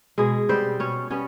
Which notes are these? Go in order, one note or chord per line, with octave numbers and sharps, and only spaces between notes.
B2 G#3 G#4
G3 B3 C4 C5
B2 C#4 C#5
G3 B3 C#4 C#5